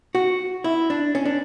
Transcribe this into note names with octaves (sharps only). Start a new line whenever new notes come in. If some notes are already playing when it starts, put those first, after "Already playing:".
F#4
E4
D4
C#4
D4